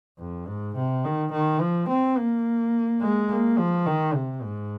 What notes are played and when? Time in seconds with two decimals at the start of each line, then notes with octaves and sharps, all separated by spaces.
0.19 F2
0.47 G#2
0.76 C3
1.05 D#3
1.32 D#3
1.61 F3
1.89 C4
2.17 A#3
3.01 G#3
3.30 A#3
3.58 F3
3.86 D#3
4.14 C3
4.43 G#2